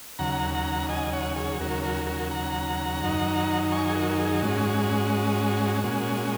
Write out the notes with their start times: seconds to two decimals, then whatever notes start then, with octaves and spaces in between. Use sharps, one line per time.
0.19 D#2 C#3 F#3 F#5 A#5
0.54 F#5 A#5
0.89 D#5 G#5
1.13 C#5 F#5
1.36 G#4 C#5
1.59 D#2 C#3 F#3 F#4 A#4
1.83 F#4 A#4
2.07 F#4 A#4
2.31 F#5 A#5
3.02 F#2 D#3 F#3 D#4
3.72 G#5 C#6
3.89 G#4
3.96 F#4 A#4
4.19 G#4
4.43 G#2 G#3 C#4 F#4
5.84 A#2 G#3 C#4